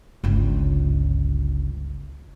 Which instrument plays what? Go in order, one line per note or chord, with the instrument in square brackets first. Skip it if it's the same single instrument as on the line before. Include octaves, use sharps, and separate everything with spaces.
[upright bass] G1 C#2